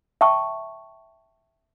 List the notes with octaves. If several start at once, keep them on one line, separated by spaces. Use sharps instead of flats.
E5 G5 A5 C#6